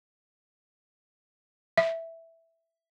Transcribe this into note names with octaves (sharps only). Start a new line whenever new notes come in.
E5